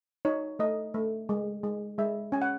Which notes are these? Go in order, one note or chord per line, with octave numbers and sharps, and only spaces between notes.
D#4 C#5
A3 D#5
A3
G#3
G#3
G#3 E5
C#4 G#5
F#5